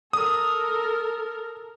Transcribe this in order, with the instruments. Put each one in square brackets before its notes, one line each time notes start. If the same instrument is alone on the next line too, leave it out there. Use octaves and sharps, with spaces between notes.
[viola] A4 A#4 [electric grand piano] D#6